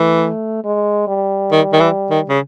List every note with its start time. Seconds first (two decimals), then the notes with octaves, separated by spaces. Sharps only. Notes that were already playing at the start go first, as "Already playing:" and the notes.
Already playing: E3 A3
0.64 G#3
1.08 G3
1.52 D#3
1.73 D#3
1.80 E3
2.11 D#3
2.29 C#3